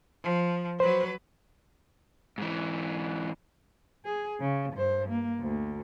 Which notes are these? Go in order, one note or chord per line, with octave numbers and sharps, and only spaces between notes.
F3
F#3 B4 C5
G#2 E3
G#4
C#3
G2 C5
A#3
D2